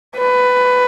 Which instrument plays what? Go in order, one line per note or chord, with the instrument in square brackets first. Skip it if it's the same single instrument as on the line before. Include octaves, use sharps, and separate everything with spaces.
[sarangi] B4